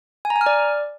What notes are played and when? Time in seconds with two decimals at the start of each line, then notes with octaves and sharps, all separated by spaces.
0.25 G#5
0.30 A#5
0.36 G#5
0.41 F6
0.46 D5